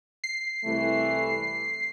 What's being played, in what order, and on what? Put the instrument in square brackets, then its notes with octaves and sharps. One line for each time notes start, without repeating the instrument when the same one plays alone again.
[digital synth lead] C7
[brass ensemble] C2 E3 A3